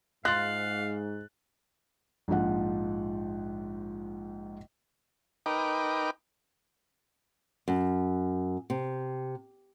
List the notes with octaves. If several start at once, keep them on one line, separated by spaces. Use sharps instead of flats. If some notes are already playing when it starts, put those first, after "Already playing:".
G#2 F4 F5 F#6 A6
A#1 G#2 F3 F#5
D#4 A#4 B4 G5 D6
F#2
C3